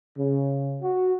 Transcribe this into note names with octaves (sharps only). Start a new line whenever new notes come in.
C#3
F#4